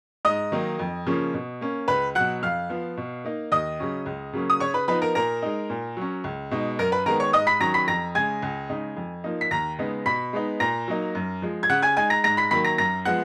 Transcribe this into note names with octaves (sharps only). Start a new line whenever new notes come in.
G#2 D#5 D#6
D#3 F#3 A#3 D#4
F2
C#3 F3 A#3 C#4
B2
A#3 C#4
C#2 B4 B5
B2 F#3 F#5 F#6
F2 F5 F6
F3 B3
B2
A#3 D#4
D#2 D#5 D#6
C#3 F#3 C#4
C#2
C#3 F#3 A#3 C#4
D#6
C#3 C#5 C#6
B4 B5
F3 B3 D#4 B4 B5
A#4 A#5
A#2 A#4 A#5
G#3 D#4
A#2
F#3 C#4
C#2
B2 G#3 D#4
F#2 A#4 A#5
B4 B5
D#3 G#3 B3 A#4 A#5
C#5 C#6
G#2 D#5 D#6
B5 B6
D#3 F#3 C#4 A#5 A#6
B5 B6
F2 A#5 A#6
C#3 G#3 G#5 G#6
C#2
C#3 G#3 D#4
F2
F3 A#3 D#4
B6
D#2 A#5 A#6
C#3 G#3 B3 D#4
B2 B5 B6
G#3 B3 D#4
A#2 A#5 A#6
F#3 A#3 D#4
F#2
F3 G#3
G#6
C#3 F#5 F#6
G#5 G#6
G#3 D#4 G#5 G#6
A#5 A#6
G#2 A#5 A#6
B5 B6
D#3 F#3 A#3 B5 B6
A#5 A#6
F#2 A#5 A#6
F3 G#3 B3 F#5 F#6